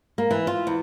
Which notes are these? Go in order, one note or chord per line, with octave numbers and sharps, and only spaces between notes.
A#3
E3
F4
E2